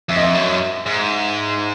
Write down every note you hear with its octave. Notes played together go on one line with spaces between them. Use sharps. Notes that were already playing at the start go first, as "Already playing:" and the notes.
F2 E5
D#5
E5
F#2
G#2